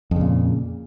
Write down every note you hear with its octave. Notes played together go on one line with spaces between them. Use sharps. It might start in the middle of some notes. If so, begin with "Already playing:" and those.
F2 A#2 C#3